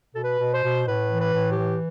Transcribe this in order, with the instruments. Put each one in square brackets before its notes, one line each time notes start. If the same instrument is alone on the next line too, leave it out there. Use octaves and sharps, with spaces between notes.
[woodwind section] B2 A4
B4
B2
C5
B2
A2 B4
E3
B4
A2
G4
E3